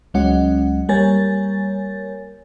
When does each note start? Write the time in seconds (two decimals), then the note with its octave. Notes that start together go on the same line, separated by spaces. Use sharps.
0.14 C#2 F#3 G#3 C#4 D#5 F#5
0.89 G3 A#3 A#4 C#5 G#5 A6